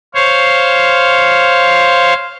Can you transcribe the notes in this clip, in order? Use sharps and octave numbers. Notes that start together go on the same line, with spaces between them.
C5 C#5 F5